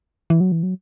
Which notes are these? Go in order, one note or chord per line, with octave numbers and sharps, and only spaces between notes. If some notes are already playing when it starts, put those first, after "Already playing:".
E3
F#3
E3
F#3